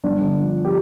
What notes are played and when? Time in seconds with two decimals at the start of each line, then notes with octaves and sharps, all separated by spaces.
0.04 G1 D4
0.21 D3
0.39 F3
0.65 G4